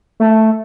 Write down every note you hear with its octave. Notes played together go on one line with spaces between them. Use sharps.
A3